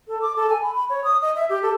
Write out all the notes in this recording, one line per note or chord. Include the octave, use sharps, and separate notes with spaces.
A4
D6
A4
G#5
B5
B5
C#5
D#6
D#5
E5
G4
A4